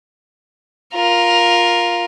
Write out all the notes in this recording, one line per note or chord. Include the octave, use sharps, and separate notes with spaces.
F4 A#4